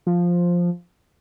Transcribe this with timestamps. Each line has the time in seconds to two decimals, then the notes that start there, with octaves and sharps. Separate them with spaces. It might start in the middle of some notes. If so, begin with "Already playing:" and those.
0.07 F3